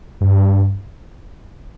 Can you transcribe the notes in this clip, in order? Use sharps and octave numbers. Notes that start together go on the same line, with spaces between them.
G2